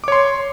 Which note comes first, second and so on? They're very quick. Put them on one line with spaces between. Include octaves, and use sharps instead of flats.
D6 C#5 C6